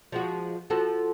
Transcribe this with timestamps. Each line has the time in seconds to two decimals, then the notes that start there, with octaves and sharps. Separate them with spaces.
0.12 F3 G#3 F#4
0.70 F3 F#4 A4